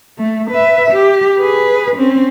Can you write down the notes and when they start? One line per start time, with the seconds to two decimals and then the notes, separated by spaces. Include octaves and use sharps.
0.19 A3
0.51 B4 E5
0.91 G4
1.39 G#4 B4
1.96 C4 C#4